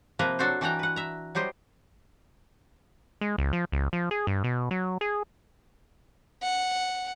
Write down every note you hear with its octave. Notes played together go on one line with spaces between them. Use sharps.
C3 F3 A#3 B4 A#5
F#3 D4 F#4 A4 C5
E3 D4 F#4 F#5 G5 A#5
B4 F#5
E5 A#5
F#3 G3 G4 C5 D#5
G#3
C#2
F3
C#2
F3
G#4
G2
B2
F#3
G#4
F#5